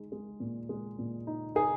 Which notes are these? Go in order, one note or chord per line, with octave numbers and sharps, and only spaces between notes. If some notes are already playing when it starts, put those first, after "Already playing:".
Already playing: G#3 D#4
G#3
A#2
G#3
A#2
D#4
D#4 G#4